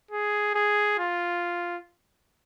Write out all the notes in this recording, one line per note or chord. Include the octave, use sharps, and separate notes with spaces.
G#4
G#4
F4